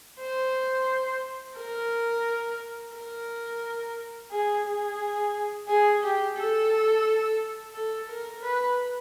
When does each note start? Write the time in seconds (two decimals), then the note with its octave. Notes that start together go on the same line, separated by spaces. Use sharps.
0.20 C5
1.57 A#4
2.93 A#4
4.31 G#4
4.65 G#4
5.68 G#4
6.03 G4
6.37 A4
7.75 A4
8.09 A#4
8.43 B4